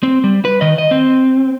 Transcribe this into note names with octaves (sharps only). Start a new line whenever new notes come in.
C4
G3
B4
D#3 D#5
D#5
C4